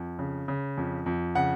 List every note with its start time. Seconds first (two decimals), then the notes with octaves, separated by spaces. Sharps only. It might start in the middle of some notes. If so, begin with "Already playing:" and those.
Already playing: F2
0.19 C#3
0.48 C#3
0.77 F2
1.06 F2
1.35 C#3 F#5